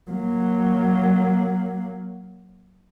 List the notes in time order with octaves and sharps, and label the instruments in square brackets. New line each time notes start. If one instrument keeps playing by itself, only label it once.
[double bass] F#3 A#3